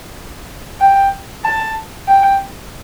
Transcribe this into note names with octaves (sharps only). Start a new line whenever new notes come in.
G5
A5
G5